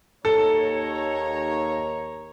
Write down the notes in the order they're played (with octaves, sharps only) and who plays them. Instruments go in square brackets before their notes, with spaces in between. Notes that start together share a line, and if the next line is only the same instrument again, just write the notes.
[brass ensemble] D#2 C#5 A#5 [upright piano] A4